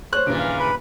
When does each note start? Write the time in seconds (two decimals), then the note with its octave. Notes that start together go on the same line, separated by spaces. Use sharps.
0.13 C5 C#5 F#6
0.26 D#1 G2 A#2 C#3 E3 D7
0.39 F5
0.59 B4 B5